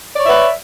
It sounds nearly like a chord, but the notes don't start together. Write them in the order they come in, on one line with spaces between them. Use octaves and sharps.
D5 C#5 E5 B4